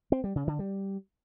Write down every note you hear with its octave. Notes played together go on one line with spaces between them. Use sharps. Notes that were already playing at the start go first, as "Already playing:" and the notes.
C4
G3
C#3
D3
G3